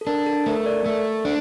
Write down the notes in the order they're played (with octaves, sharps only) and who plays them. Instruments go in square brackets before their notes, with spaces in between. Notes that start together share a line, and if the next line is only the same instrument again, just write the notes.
[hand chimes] A4
[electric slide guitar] D4 [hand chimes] A#4
[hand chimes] A4
[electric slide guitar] A3 [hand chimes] A#4
[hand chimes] A#4 D5
[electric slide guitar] A3
D4